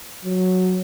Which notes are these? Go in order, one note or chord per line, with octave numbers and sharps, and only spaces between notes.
F#3